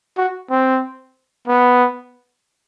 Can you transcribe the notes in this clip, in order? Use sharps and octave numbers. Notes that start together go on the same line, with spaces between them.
F#4
C4
B3